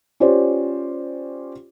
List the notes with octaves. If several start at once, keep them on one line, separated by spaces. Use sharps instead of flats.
C#4 F4 G4 C5 D5